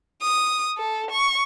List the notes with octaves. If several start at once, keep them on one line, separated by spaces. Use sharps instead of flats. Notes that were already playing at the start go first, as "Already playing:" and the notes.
D#6
A4
C#6